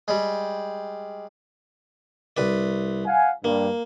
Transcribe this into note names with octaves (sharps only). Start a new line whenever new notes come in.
G3 G#3
C2 B4 D5
F5 F#5 G#5
G2 A#3